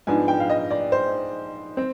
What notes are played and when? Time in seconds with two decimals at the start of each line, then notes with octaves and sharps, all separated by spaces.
0.07 G#2 F3 G#3 B3 D4 G#5
0.28 G5
0.40 F5
0.50 D#5
0.71 D5
0.92 C5
1.77 C4